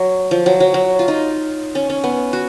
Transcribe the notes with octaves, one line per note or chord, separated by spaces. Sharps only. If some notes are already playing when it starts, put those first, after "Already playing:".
Already playing: F#3
F3
F#3
F#3
F#3
F4
D#4
C#4
C#4
B3
F#4